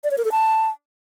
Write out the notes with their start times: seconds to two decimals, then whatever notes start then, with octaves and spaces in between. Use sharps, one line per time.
0.04 D5
0.11 C#5
0.18 A#4
0.25 A4
0.32 A5